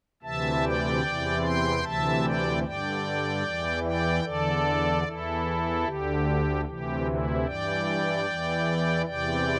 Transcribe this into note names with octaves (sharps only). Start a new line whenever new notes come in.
D2 C3 E3 E5 A5
D5 G5
E2 C3 E3
G5 C6
D2 C3 E3 E5 A5
D5 G5
G2 D3 D5 G5
E2 E3
D5 G5
E2 D3 A4 D5
E2 E3 E4 A4
D2 D3 G4
D2 C3 E3 G4
E4
G2 E3 D5 G5
E2 E3
E2 C3 E3 D5 G5